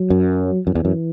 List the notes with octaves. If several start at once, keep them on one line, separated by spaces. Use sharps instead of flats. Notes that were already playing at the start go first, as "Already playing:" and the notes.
Already playing: F#3
F#2
F#2 E3
E2
F#2